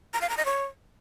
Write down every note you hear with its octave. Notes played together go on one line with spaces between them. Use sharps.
A#5
F5
A#5
D#5
C#5